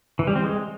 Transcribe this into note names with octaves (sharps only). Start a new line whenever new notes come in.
E3
G3
C4
G#3